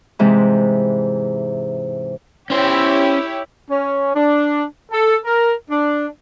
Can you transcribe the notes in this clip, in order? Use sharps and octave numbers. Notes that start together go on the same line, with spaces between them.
G#2 C3 E3 G#3
C#4 E4 G4 C5 C#5
C#4
D4
A4
A#4
D4